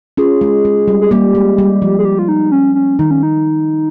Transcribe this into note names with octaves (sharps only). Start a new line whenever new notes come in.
C#4 F4 G#4
G#3
G#3
G3
G#4
G3 A#3 G4
G#3
G3
F3
G#4
G4
F4
D#4
C#4
C#4
D#3 D#4
C#4
D#4